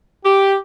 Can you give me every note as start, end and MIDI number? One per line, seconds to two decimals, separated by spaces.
0.25 0.56 67